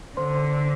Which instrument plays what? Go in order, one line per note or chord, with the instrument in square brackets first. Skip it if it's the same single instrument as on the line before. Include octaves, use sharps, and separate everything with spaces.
[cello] D3 [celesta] C5 C6